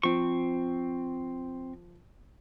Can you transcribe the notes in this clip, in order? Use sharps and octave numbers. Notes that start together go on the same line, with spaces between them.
F3 C4 C#6